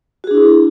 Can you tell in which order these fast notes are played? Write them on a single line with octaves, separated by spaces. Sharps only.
F#4 G#4 D4 E4